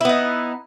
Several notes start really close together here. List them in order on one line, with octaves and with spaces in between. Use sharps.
E4 B3 D#4